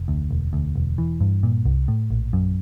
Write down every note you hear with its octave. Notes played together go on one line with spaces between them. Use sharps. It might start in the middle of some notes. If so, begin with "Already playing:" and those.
Already playing: F1
D2
E1
D2
E1
E3
G2
A#2
C2
A2
A#1
F#2